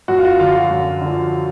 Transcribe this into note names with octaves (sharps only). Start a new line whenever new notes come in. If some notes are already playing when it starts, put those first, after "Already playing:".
F#2 F#4
F4
F#4
D3 F3 F4
F#4
F#2
D3 F3